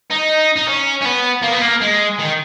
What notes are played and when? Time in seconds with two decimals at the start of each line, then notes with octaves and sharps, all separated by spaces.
0.11 D#4
0.56 D#4
0.68 C#4
1.01 C#4
1.05 B3
1.42 A#3
1.52 B3
1.61 A#3
1.81 G#3
2.19 D#3